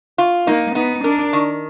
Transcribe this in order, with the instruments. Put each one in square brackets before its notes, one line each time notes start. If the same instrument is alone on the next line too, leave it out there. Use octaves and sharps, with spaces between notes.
[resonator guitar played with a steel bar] F4
[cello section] A#3 [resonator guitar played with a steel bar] D#4
[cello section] B3 [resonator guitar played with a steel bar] D#4
[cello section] D4 [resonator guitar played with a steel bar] A#4
[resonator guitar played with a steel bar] D#3